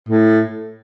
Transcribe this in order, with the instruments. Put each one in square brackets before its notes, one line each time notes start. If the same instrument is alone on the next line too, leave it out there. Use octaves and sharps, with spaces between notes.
[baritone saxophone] A2